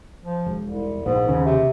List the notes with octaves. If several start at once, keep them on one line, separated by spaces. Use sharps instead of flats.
F3
E1
C2
A#1 G#2
D#2 C#3
C3